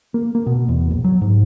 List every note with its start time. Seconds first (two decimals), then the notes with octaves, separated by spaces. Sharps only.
0.14 A#3
0.35 A#3
0.46 B2
0.69 E2
0.91 A#1
1.04 F#3
1.22 G#2